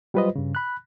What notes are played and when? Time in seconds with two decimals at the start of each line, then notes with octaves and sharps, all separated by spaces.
0.14 F#3 G3 F4 B4 C5 D#5
0.36 G2 C#3
0.55 B5 F#6